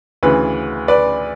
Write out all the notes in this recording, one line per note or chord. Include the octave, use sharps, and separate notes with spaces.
D2 C#3 E3 B4
B4 D5